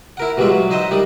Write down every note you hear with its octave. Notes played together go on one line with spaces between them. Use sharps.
E4 A#4 F#5
B2 E3 G3 G#3 F4 E5
F#3
D#4 C5 D#5 E5 F#5
D#3 G3 D#4